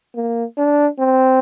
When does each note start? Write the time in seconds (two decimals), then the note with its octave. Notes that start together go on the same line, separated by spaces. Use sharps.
0.15 A#3
0.58 D4
0.99 C4